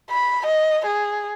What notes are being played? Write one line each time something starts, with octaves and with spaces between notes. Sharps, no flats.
B5
D#5
G#4